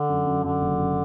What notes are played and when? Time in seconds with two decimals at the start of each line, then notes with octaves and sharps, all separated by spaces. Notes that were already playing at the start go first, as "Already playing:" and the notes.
Already playing: D3
0.09 F#2
0.26 F#2
0.44 F#2 D3
0.62 F#1
0.79 F#2